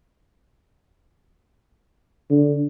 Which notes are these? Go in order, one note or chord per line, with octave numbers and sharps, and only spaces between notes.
D3